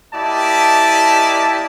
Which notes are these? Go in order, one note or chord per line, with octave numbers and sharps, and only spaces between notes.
A#3 E4 G4 D5 D#5 A5